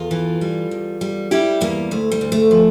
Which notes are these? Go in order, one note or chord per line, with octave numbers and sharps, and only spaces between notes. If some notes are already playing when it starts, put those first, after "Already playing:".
Already playing: E2 F4 A4
E3
G3
E2
G3
G3 E4 G4
E2 G3 A#3
D2 A3
G3
D2
A3
F3